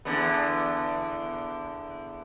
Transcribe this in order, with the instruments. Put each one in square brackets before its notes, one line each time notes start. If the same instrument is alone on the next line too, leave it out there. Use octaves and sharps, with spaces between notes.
[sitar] E2 D3 B3